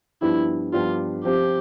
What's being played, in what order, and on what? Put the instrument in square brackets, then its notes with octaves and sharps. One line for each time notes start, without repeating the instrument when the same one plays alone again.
[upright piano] G2 F3 B3 D4 G4 [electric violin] E4
[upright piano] G2 F3 B3 D4 G4 [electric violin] F4
[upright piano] F3 C4 F4 C5 [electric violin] G4